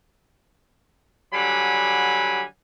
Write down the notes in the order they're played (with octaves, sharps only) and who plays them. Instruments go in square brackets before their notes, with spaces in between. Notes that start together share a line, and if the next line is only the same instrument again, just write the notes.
[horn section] D3 F#3 G3 G#5 B5